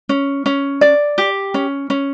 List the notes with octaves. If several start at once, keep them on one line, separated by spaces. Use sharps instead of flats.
C#4
C#4
D5
G4
C#4
C#4